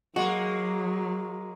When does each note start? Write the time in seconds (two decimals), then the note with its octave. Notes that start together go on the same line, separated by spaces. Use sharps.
0.16 F#3 G#3 A#3 F#4